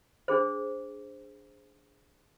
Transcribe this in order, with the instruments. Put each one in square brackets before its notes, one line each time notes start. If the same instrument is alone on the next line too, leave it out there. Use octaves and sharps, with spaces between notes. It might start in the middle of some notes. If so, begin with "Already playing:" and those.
[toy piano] D4 G#4 C5